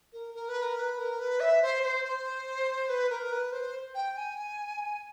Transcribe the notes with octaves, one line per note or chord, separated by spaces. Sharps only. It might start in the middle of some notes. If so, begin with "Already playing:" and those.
A#4
A#4
B4
A#4
B4
A#4
B4
E5
C5
C5
C5
B4
A#4
B4
C5
G5
G#5